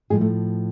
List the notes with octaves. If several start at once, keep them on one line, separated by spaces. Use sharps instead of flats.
A2 F3 G#3 G#4
A3